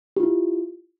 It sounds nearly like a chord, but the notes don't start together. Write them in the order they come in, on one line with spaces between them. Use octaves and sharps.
G4 F4 E4